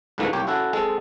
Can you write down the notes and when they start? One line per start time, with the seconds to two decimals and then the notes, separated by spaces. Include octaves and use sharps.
0.18 C#2 G#2 D3 E3 A3 A#3
0.33 C2 A#3 G4 C#5
0.47 C#4 E4 F#4 A4
0.73 G#3 C4 A4